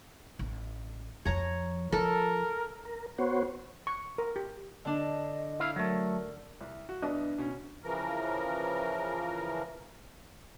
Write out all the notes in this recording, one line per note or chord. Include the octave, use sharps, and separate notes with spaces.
A1
F2 F3 C#5 A#5
F3 F4 A4 A#4
A#4
B3 F#4 C5 C#5
C#6
A#4
G4
D3 D4 D#5
E4 F5
F#3 A3 A#4
C2
F#4
C2 B3 D4 D#5
B2 C#4
C#3 E3 F3 A#4